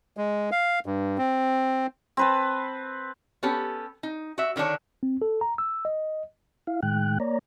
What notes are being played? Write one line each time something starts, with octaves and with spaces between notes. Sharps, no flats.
G#3
F5
G2
C4
C4 B4 A5
B3 C#4 G4 A4
D#4
F#4 E5
D3 D#3 B3 D4 C#5
C4
A4
A#5
E6
D#5
E4 F5
A2 D#3 G#3 G5 F#6
A#3 C#5 D5 A#5